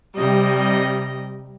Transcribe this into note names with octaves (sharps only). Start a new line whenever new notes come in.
C3 G3 D#5